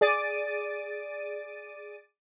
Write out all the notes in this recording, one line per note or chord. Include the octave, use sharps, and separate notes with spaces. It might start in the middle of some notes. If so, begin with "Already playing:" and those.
G#4 D5 A6 D7 D#7